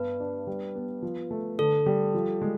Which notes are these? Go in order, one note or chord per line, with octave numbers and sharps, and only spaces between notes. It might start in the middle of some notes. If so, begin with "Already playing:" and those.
Already playing: G2 B3 B4
D4
G3
B3
F3
A3
D3 A4
G3
F3
G#3